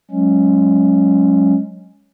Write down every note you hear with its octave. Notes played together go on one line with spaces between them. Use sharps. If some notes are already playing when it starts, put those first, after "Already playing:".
F#3 G#3 C#4